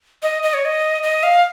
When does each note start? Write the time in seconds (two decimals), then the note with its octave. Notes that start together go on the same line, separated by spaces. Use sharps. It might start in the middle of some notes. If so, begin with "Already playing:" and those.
0.23 D#5
0.43 D#5
0.54 C#5
0.65 D#5
1.03 D#5
1.23 F5